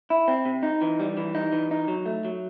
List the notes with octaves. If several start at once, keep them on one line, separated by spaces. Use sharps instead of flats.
E4
C4
C3
D#4
E3
G3
E3
D#4
E3
D#4
F#3
A3
F#3